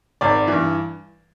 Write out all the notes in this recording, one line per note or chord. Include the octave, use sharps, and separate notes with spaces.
G#1 D5
G2 E3